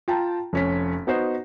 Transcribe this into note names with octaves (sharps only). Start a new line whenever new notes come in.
F4 G5 A5 A#5
F1 C#4 B6
B3 D#4 F#4 C5